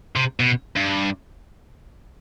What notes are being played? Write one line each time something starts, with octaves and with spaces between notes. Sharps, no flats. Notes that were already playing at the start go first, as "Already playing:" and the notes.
C3
B2
G2